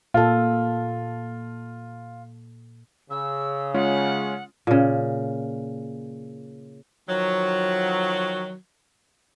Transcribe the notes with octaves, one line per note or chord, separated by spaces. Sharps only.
A#2 F4 A4
C#3 E6
G#3 C#4 F4 F#5
A#2 C#3
D#3 F3 F#3